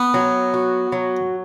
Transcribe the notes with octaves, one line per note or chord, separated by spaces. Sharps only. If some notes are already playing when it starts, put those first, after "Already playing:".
Already playing: B3
F#3
F#4
F#3